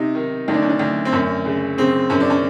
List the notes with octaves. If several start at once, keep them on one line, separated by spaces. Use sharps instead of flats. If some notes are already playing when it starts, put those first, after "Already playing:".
Already playing: C3 D#4
D#3
D2 D#4
D4
C#4
D4
D2
C4
F#2 C#4
C#3
C#3 C4
F#2 C#4
D4
C#4